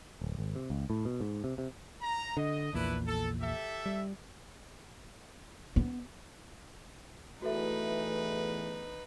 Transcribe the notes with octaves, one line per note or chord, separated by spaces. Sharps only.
D1
G#1
C3
C#2
A2
B2
G#2
C3
C3
A#5
D3 D#5
A#1 E2 A#2 D4 E4 B4
A4
G4 A4 E5
G3
B3
E2 E3 A3 D#4 F#4 A4 B4 E5